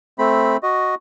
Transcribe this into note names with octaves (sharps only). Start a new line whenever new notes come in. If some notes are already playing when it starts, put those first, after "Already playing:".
A3 C4 B5
F#4 D#5